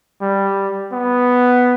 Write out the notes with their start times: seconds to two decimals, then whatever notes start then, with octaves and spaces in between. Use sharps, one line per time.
0.21 G3
0.92 B3